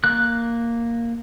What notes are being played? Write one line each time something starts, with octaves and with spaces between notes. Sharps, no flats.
A#3 F#6